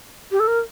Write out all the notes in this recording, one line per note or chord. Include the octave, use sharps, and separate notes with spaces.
G4
A4
A#4